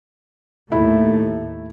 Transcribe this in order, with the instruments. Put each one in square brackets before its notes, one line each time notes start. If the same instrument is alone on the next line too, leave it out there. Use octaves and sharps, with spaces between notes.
[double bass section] D#2 A2 A3 [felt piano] E4